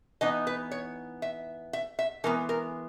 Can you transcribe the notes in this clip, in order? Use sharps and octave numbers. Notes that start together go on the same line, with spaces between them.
E3 B3 D#4 D#5
B4
C#5
E5
E5
E5
E3 G#3 B3 A#4
A#4